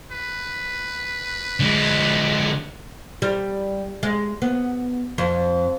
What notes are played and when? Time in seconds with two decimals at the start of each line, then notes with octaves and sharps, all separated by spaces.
0.12 B4
1.60 D3 G#3
3.22 G3
4.03 G#3
4.42 B3
5.18 F2